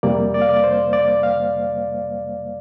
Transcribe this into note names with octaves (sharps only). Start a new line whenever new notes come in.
F2 C3 G3 A#3 D5
D5
F5
D5
C5
D5
F5